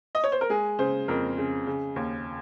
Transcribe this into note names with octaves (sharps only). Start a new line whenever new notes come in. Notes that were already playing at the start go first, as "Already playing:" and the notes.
D#5
C#5
C5
A#4
G#3 G#4
C#3 C5
F2 A#4
C#3
C#3
D#2